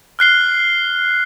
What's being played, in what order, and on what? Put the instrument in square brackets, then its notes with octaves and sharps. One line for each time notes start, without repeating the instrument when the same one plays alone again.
[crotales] F6 F#6 C7 G7